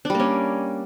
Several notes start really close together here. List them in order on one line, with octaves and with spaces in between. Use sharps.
D4 G3 A#3 C#4